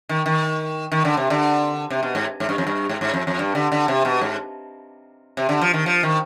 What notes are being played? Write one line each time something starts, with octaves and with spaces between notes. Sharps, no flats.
D#3
D#3
D#3
D3
C3
D3
C3
B2
G#2
G#2
G2
F2
G2
G#2
G#2
F2
F2
G2
D3
D3
C3
B2
G#2
C3
D3
F3
D#3
F3
D#3